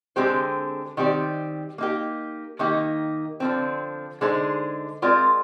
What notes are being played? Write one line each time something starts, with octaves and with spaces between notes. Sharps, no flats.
D3 G#3 C4 G4 C5
D#3 G3 C4 G4 D5
A#3 D#4 G4
D#3 A#3 D#4 G4
D3 F3 C4
D3 G#3 D#4 G#4 C5
G#3 C4 F4 A#4 D5